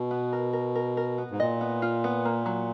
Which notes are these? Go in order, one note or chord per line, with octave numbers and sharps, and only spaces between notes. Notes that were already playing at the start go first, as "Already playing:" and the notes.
Already playing: B2
B3
A#4
A#4
A#4
A#4
B3
G#2
A#2 D#5
B3
F4
B3
A#3
F#3